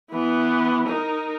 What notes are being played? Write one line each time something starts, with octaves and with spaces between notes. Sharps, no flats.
E3 B3
D#4 A#4